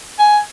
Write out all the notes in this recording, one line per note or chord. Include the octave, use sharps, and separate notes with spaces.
G#5